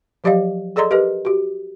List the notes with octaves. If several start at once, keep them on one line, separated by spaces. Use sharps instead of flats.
F3 F#3 G4 D5 D#5 F5
G#4 A4 D5 D#5 A#5 C6
G4 A#4 B4 D#5
F#4 G4